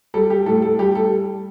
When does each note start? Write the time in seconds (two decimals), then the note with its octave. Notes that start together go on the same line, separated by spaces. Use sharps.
0.14 G3 A4
0.30 G4
0.46 A2 A4
0.62 A4
0.79 G3 G4
0.95 A4